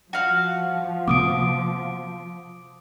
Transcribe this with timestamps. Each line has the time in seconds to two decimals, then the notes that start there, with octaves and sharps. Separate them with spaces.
0.13 F3 F#4 F5
1.08 C3 A#3 B3 D6 D#6 D7